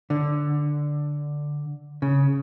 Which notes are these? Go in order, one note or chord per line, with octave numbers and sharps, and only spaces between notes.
D3
C#3